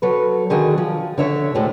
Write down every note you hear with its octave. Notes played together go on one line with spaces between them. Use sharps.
F#3 A4 B4
D3 D#3 F#3 G#4
F3
D3 C#5 E5
D2 A2 G#3